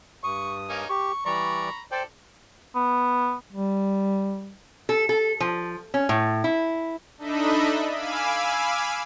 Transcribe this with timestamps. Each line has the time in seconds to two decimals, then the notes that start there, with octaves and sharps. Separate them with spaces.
0.24 G2 C#6 D#6
0.69 A#3 C#4 D#4
0.89 G4 C#6
1.26 E3 G3 D5 A#5 B5 C#6
1.92 A4 C5 D5 G5
2.75 B3
3.52 G3
4.89 A4
5.09 A4
5.40 F3
5.94 C#4
6.09 A2
6.44 E4
7.18 D4 D#4 A4 D#5 E5 B5
7.92 F5 G#5 B5 D6 E6